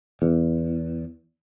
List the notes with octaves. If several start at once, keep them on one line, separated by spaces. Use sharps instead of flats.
E2